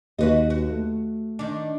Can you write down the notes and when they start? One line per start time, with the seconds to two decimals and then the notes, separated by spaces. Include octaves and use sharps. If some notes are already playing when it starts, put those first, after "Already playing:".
0.19 D#2 F#4 B4 D#5
0.50 F#4
0.70 A3
1.39 D#3 D4